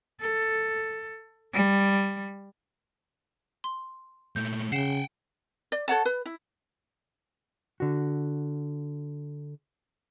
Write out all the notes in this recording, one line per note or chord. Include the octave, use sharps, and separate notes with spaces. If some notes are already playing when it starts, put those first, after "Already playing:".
A4
G3
C6
A#2 A3 G6
C#3 F#5 G5 C7 E7
D5
A4 C#5 F#5 A5
B4
E4
D3 F#4